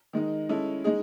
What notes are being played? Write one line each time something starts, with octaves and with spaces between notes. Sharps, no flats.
D#3 G#3 D#4
G#3 C#4 E4 A4
G#3 D#4 G#4